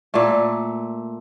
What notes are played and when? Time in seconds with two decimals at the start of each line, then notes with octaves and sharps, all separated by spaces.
0.14 A#2 A3